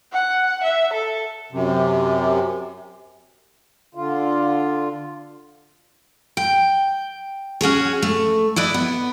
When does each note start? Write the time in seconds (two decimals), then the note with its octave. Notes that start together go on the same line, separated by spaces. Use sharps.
0.13 F#5
0.63 E5
0.93 A4
1.52 F#2 C3
3.95 D3 F4
6.37 G5
7.61 C#4 F#4 G#4 C#5
8.02 A3
8.56 E4 B4 D5 D#5
8.74 B3